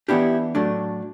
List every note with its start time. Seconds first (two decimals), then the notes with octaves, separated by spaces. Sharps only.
0.08 E3 B3 D4 E4 G4
0.55 A2 F#3 A3 D4